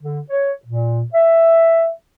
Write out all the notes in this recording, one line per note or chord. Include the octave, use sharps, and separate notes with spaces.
D3
C#5
A#2
E5